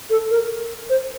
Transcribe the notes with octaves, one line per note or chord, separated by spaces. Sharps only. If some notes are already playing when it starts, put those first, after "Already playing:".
A4
A#4
C5